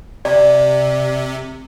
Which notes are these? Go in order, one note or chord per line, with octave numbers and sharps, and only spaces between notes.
C3 D5